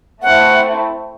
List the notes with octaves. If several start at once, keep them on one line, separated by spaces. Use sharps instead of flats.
A3 C4 E4 F#5